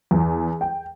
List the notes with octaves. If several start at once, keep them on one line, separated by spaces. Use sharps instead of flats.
E2
G5